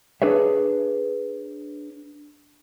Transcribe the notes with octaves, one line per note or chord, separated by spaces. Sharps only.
D4 G#4 B4 C#5 E5